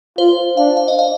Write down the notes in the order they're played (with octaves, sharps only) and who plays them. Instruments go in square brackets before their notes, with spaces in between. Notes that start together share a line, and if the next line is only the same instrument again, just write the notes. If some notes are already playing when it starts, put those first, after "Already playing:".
[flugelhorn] F4 [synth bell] C5
[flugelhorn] D4 [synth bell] F5
[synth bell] F5
D#5
F5